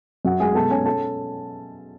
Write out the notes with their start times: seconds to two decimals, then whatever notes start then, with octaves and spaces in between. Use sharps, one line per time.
0.25 F#2 F#4 F#5
0.40 G#3 G#4 G#5
0.55 B2 A4 A5
0.70 C#4 G#4 G#5
0.85 A4 A5